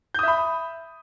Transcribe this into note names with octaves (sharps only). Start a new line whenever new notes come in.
E5 B5 D#6 G6